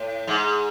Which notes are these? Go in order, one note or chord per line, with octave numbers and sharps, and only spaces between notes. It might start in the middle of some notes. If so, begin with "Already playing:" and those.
Already playing: A2
G#2